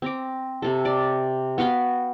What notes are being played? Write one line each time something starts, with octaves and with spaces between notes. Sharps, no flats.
C4 A#5 D6
C3 A4
D5
B3 F#4 F5 G5